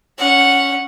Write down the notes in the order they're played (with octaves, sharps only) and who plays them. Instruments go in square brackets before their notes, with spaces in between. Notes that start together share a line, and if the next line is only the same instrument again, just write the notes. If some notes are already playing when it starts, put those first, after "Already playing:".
[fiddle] C#4 F#5